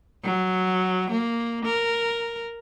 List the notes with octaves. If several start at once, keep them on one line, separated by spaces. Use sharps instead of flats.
F#3
A#3
A#4